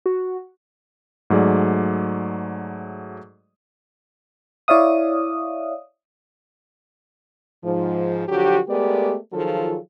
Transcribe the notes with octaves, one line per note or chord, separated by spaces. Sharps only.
F#4
G#2 F#3 A3 G#4 D5
E4 C#5 D5 E5 F5 D#6
G#2 F3
D3 F3 F#3 F#4 G4
G#3 A3 B3 G4 A#4 D5
D#3 F3 F#3 F4 G#4 A4